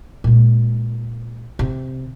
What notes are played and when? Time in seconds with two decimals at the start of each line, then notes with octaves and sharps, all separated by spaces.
0.24 A#2 G#3
1.59 C3